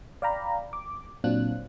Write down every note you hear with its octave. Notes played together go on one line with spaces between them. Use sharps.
D5 F5 G5 A#5 B5
D6
A#2 F#3 C4 D4 F4 F#6